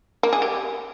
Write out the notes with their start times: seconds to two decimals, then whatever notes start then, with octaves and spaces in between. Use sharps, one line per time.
0.23 A#3
0.33 G#4
0.42 G4